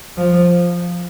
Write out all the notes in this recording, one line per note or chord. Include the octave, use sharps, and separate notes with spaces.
F3